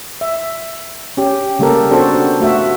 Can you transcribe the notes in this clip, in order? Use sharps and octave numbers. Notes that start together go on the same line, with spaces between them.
E5
C#4 G4
C#3 G3 A#3 G4 A4 A#4
B3 D4 F#4 A4 C5
A3 F4 F#4 E5